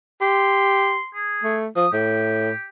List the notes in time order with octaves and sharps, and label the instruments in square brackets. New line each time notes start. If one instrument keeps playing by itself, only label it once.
[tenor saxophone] G4 [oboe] C6
[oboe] G#4
[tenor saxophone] A3
[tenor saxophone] F3 [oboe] D#6
[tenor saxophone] A2 [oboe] G4